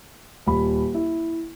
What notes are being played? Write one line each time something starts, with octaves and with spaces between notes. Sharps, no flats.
D#1 B5
E4